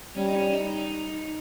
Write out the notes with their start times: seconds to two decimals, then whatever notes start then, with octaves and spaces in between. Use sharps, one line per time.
0.16 G3 C#4
0.28 D#4
0.35 C#4
0.53 D#4